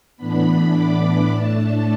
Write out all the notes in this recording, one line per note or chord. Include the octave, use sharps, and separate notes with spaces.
A2 E3 B3 D4 B5
D6
A2 A3 D4 A5